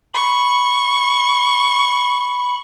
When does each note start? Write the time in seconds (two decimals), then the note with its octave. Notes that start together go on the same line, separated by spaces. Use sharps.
0.14 B5 C#6